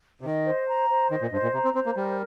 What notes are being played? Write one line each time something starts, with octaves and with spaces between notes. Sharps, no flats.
C3
D#3 D#5
C5
A#5
C5
D#3 D#5
A#2
G2 C5
A#2
C3 A#5
C4
C4 C5
A#3
G3 A#4